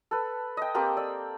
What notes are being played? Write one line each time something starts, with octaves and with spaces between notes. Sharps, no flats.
A4 B4
D#5 G5
A#3 C4 G4 A4
D5 E6